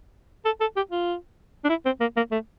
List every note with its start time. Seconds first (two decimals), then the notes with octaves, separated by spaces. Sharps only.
0.45 A4
0.61 A4
0.76 G4
0.92 F4
1.64 D4
1.69 E4
1.85 C4
2.01 A#3
2.16 A#3
2.32 A3